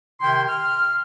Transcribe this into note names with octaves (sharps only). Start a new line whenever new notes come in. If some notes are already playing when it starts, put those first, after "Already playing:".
C3 D#3 E4 G5 C6
F6